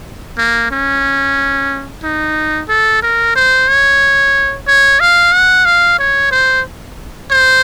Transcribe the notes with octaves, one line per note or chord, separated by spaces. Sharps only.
A#3
C#4
D#4
A4
A#4
C5
C#5
C#5
F5
F#5
F5
C#5
C5
C5